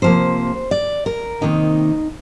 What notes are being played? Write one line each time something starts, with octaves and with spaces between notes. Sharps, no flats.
C3 F3 A#3 C5
D5
A#4
C3 D#3 A#3 D#4